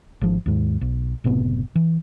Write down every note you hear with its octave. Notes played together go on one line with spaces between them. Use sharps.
G#1 F3
D#2 G#2
B1
F#1 A2 C3 B3
E3